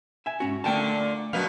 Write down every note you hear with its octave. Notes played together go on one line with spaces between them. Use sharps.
E5 G#5
G#2 C#4 F#4
A#2 D3 A3 G5 A5
F#2 B2 F#3 B3 B4 F5